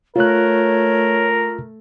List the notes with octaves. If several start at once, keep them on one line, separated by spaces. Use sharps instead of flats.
A3 F4 A#4 C#5 F#6